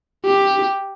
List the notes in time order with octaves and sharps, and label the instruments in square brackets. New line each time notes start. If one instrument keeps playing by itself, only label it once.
[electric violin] G4